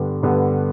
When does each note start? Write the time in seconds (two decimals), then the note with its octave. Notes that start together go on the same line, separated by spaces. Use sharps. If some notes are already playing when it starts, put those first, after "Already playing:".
Already playing: G2 D3 G3 B3
0.23 G2 D3 G3 B3